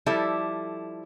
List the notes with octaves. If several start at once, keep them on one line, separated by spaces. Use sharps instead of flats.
F3 G3 E4 A4